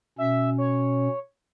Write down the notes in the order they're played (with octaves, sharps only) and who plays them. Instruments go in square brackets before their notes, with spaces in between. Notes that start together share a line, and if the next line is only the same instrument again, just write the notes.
[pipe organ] B2 C#4 [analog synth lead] E5
[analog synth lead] C#5